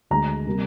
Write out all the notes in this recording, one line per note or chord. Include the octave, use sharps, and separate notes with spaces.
D2 D3 G#3 A#5
C3 G3 A#3